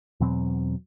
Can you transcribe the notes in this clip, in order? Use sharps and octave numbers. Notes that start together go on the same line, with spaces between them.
E2 B2 F#3 C4